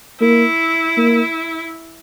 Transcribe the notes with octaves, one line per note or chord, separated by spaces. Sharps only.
A#3 E4
A#3